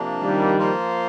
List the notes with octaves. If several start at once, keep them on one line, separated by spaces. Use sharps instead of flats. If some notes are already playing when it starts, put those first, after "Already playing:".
Already playing: C3 F3 A#3 D4
D#3 G3
F3 A#3 F4 C5